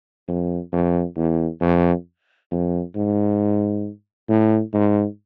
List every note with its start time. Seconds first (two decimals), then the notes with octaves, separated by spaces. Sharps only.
0.28 F2
0.72 F2
1.17 E2
1.61 F2
2.51 F2
2.95 G#2
4.29 A2
4.74 G#2